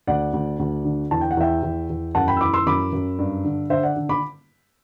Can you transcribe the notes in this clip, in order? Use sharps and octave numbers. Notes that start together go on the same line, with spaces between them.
D2 D5 F#5
D2
D2
D3
E2 A5
G5
F#5
E2 E5 G5
E2
E2
F#2 F#5 A5
G5 B5
E6
E3 B5 D6
C6 E6
F#2 B5 D6
F#2
G2
D3
D3 C5 E5
D5 F#5
D3
B5 D6